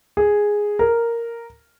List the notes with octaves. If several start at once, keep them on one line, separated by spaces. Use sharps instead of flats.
G#4
A#4